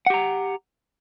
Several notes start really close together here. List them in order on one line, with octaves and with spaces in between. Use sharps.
F#5 G4 A#5